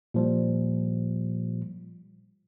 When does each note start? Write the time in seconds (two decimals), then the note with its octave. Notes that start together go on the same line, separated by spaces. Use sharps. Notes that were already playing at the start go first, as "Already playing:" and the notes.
0.14 A#2 F3 G3